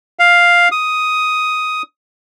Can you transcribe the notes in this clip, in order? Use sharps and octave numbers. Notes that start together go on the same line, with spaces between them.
F5
D#6